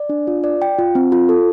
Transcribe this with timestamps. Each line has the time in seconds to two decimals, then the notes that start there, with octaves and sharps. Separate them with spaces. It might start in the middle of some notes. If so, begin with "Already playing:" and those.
Already playing: D5
0.09 D4
0.27 F4
0.44 D5
0.62 G5
0.79 F4
0.95 C4
1.12 F4
1.29 A4